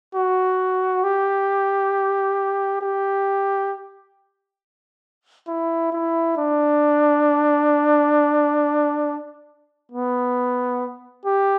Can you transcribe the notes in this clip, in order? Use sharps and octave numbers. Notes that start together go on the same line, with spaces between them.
F#4
G4
G4
E4
E4
D4
B3
G4